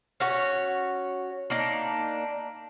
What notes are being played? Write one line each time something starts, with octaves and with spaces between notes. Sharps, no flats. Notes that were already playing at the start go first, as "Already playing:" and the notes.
C#4 F#4 C#5
A#3 D4 D#4